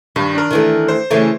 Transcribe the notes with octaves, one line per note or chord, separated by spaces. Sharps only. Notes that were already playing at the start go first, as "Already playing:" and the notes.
G2 D#3
D4 A#4
D#3 E3 A3
C5
C#3 E3 A3